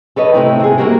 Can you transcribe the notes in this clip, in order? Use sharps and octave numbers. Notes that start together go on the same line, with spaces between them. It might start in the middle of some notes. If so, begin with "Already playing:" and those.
A4 B4 C#5 D#5
C3 D#3 A3 C4 D#4 E4
C3 G#4
A#3 E4 F#4 G4 A#4